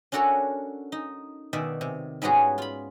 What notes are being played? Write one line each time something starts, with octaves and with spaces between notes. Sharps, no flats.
C#4 D4 F#4 A4 A#4 C#5
D#4
B2 D#3 D5 E5
C3
G#2 G3 B3 C#4 F#4 G#4
F4 B5